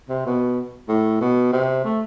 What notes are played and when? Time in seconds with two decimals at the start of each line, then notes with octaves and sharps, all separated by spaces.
0.09 C3
0.25 B2
0.88 A2
1.21 B2
1.52 C3
1.84 A3